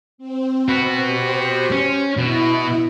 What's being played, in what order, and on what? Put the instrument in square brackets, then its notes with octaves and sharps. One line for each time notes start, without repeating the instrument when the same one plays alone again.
[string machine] C4
[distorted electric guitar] F#4 B4
[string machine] G4 C5
[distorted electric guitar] C#4
[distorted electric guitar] B2 [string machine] E4